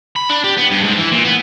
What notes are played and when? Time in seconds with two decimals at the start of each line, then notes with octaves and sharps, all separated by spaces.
0.16 B5
0.29 D4
0.44 G4
0.57 B3
0.71 G2
0.84 G#2
0.97 E3
1.11 A#2
1.24 B3